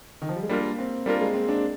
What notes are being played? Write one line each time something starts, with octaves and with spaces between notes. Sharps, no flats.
D#3
F3
G3
G#3
G3 A#3 D4 F4 A#4
C4
G3 A#3 D4 F4 A#4
G#3
C4
D4